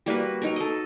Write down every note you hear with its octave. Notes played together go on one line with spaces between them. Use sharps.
G3 A#3 F#4 B4
F#3 D#4 A#4
A4 D#5